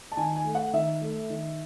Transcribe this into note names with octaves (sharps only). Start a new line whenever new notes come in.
A5
D#3 G#5
G#5
A3
F#5
D#3 E5
A3
D#3